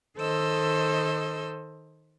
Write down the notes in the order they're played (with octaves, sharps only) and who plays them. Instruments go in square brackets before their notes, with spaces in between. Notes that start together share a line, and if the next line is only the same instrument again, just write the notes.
[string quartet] D#3 A4 C5 D#5 E6